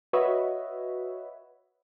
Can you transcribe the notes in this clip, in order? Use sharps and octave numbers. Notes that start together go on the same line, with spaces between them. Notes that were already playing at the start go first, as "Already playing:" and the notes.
F#4 B4 C#5 D#5 E5